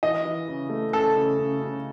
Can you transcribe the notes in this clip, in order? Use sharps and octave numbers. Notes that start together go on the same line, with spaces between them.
E3 D#5
E3
C#3
A3
C#3 A4
C#3
C#3
C#3